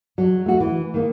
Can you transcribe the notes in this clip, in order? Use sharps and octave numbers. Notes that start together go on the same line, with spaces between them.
F#3
A3 F#4
E3
D#3 A#3